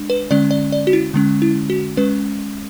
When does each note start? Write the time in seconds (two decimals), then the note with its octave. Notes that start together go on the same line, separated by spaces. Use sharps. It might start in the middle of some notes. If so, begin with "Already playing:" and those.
Already playing: G#3 D4
0.10 B4
0.31 D3 G#3 C#4 D5
0.51 D5
0.72 D5
0.87 F#4
0.93 E4
1.14 D3 G#3 C#4
1.42 E4
1.70 F#4
1.97 G#3 C#4 B4